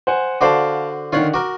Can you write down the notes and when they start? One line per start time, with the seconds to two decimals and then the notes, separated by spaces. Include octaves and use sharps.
0.07 C5 F#5 G#5
0.41 D3 F#4 C5 D5 F5 A5
1.13 D3 D#3 F4 C#5 F#5
1.34 F#4 A#4 D6